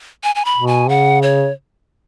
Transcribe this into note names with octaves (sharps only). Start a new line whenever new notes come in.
G#5
G#5
B5
B2
G#5
C#3 F#5
C#5